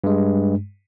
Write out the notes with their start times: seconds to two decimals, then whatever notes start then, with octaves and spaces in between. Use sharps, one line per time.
0.04 G2 G#3